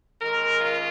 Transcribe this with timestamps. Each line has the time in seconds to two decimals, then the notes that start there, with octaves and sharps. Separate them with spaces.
0.21 D#2 D#3 G#3 C#4 A#4
0.61 F4